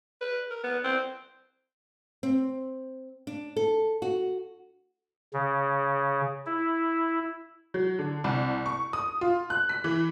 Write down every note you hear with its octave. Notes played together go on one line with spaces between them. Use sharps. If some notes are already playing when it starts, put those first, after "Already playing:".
B4
A#4
B3
C4
C4
D4
A4
F#4
C#3
E4
F#3
D3
C2
C#6
D#6
F4
F#6
B6
E3